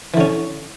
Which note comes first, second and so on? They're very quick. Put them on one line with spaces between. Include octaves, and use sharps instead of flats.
E3 D3 C#4